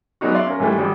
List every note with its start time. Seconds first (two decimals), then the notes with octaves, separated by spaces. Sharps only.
0.21 F#3 G#3 B3 D4 D#4 F#4
0.34 D5 E5 F5 C6
0.47 C#4 A#4
0.60 G#2 E3 G3 A3
0.78 G#1 D3 G3